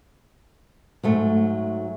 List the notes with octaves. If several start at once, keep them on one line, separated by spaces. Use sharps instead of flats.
G#2 F#3 A3